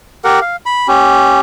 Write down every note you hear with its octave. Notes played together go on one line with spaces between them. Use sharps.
G4 A#4 F#5
F5
B5
C#4 G4